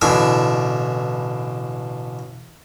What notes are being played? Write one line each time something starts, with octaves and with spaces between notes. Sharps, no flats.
A1 B2 D3 E4 G#5